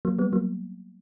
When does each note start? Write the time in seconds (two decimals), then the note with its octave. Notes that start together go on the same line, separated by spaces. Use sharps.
0.05 F#3 A#3
0.19 G3 B3
0.33 F#3 A#3